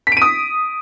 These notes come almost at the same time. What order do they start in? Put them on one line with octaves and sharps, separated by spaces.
B6 D7 D#7 D#6